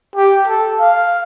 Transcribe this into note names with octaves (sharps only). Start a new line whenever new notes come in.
G4
A4
F5